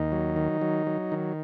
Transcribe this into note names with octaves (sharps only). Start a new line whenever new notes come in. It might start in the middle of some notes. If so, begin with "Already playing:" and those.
Already playing: D#2 D#4
F#3
D#3
F#3
F#3
D#3